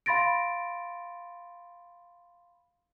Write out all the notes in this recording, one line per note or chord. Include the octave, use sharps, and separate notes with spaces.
F5 B5 C6 A6 A#6 D7